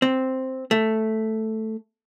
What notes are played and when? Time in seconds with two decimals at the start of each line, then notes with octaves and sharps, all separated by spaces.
0.02 C4
0.71 A3